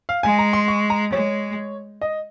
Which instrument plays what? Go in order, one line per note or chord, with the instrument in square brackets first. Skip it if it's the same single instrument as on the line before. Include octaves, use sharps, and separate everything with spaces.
[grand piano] F5
[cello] G#3 [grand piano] G#5
[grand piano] A#5
C6
C#6
A#5
[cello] G#3 [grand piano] C#5
[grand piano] D#5